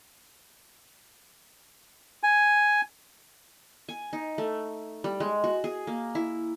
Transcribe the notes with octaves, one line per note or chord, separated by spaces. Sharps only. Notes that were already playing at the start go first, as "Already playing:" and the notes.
G#5
G#5
D#4
A3
G3
G#3
F#4
G#4
A#3
E4